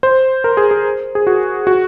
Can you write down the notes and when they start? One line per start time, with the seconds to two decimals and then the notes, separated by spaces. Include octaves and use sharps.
0.03 C5
0.44 A#4
0.57 G#4
0.71 G#4
1.15 G#4
1.27 F#4
1.67 F#4